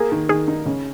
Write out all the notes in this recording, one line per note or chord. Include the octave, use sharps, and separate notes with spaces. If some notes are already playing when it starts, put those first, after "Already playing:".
Already playing: A#3 G#4
D#3
D#3 G#4
D#4
C#3